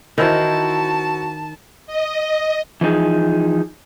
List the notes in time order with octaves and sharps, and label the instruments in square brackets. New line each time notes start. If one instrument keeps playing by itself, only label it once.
[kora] D#3 [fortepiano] E3 E4 C5 [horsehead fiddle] F#4 [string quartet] A5
[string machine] D#5
[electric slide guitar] E3 F3 D#4 G#4